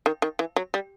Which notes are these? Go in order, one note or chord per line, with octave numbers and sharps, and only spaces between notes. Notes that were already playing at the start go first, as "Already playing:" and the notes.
D#3
D#3
E3
F#3
G3